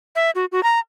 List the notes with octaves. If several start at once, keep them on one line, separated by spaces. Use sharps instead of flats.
E5
F#4
F#4
A#5